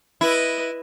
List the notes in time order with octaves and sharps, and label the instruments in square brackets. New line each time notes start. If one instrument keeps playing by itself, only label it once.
[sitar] E4 [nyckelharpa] B4 D#5